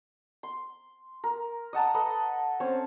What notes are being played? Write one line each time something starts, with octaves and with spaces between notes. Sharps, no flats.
C6
A#4
D#5 F#5 A5 A#5
A4 B4 D#5 B5
C4 C#4 C#5